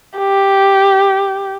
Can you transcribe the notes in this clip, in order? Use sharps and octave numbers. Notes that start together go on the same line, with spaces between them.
G4